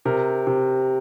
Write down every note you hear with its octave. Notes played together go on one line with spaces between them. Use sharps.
C3 A#4
C3